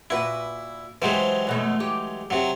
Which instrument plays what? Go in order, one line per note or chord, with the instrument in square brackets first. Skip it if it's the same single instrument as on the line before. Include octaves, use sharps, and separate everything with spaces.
[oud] A#2 F#4 B4 [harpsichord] E4
[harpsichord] E3 F#3 G#3 [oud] G4 A4 C5
[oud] F#2 B2 A3
G4
[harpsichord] C3 F#3